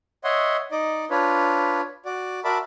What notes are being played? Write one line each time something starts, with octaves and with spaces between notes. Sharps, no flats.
C#5 D#5 E5 F#5 C6
D#4 D5 D#5
D4 F4 B4 C#5
F#4 D5
F#4 A#4 D5 E5 A5 B5